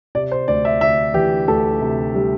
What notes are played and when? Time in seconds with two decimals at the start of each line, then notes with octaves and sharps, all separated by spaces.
0.15 C3 D5
0.32 C5
0.48 D2 D5
0.65 E5
0.81 D2 E5
1.14 E3 G4
1.48 D2 A4
1.82 C3
2.15 G3